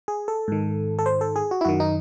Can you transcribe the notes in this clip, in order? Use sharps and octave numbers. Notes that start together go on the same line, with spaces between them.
G#4
A4
G#2 D#3
A4
C5
A4
G#4
F#4
E4
F#2 D#3 F#4
D#4